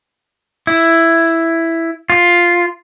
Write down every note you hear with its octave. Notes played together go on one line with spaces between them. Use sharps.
E4
F4